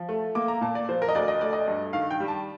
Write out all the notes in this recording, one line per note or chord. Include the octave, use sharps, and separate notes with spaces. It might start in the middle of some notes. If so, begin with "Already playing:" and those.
Already playing: F3
A3
A#3 D6
A#5
A#2 A5
D5
F3 C5
A#4
D#5
D2 D5
D#5
A3 D5
D#5
G2
D#3 F5
G5
G3
A5